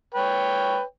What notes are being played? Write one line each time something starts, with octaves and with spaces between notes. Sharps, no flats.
B4 C#5 G5